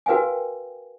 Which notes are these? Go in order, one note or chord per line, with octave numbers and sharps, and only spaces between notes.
F#4 A#4 B4 F5 G5 G#5